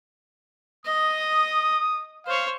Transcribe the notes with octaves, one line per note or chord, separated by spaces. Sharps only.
D#5 D#6
C5 C#5 F5